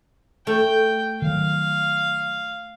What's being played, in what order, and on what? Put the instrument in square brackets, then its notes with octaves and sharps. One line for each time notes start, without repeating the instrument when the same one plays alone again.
[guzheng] A3 [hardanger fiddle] G5
[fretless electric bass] D#3 F#3 [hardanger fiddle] F5